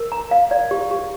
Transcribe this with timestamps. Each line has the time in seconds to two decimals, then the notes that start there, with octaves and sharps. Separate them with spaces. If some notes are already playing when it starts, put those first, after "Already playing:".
Already playing: A#4
0.12 A#5
0.31 F5
0.51 D5
0.71 G4
0.91 G4